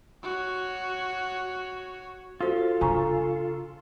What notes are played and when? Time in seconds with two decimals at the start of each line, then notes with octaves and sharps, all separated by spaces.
0.23 F#4 C#5
2.41 F4 F#4 A4 C5
2.81 C#3 D4 G#5 A#5 C#6